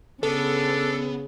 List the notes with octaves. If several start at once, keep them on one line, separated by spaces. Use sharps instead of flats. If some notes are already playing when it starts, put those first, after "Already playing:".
C#3 B3 D4 A4